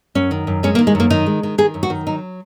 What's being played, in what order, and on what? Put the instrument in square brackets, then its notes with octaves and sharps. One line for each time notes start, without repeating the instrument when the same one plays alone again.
[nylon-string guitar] F#2 C#4
D#3
F#2
G#3 C#4
A#3
D#3
G#3
F#2 A#3
D#3 D#4
G#3
D#3
D#3 G#4
F#2
F#4
D#3
F#3 D#4